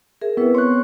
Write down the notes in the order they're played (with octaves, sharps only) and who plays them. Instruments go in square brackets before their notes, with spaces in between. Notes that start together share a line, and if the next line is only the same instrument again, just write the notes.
[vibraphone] G#4 A#4 E5
[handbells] B3 C4 [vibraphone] E4 B4
[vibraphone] C#5 [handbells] C6 C#6 F#6